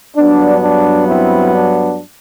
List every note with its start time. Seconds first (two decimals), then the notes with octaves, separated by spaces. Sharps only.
0.16 G2 F#3 B3 D4
0.62 D4
1.08 C4 E4
1.54 D4